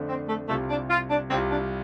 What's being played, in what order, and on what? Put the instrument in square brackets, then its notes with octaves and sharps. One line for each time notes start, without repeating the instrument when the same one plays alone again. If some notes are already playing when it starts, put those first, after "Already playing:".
Already playing: [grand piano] F2 D3 A3 D4
[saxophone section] C4
A3
[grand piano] C2 C3 G3 F4 [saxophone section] A3
[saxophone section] D4
F4
D4
[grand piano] C2 C3 G3 F4 [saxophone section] C4
[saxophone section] D4